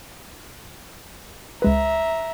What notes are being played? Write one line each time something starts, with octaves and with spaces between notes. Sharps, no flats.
C#2 G#3 B4 E5 A#5